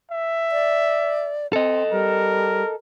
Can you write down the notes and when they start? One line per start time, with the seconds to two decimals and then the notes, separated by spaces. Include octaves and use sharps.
0.11 E5
0.52 D5
1.53 C4 A4 D#5
1.91 G3 A#4